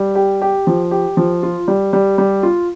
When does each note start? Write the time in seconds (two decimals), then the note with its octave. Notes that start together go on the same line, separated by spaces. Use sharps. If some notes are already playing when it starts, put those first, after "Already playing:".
Already playing: G3
0.15 G4
0.42 G4
0.67 F3
0.91 G4
1.17 F3
1.43 F4
1.68 G3
1.93 G3
2.18 G3
2.43 F4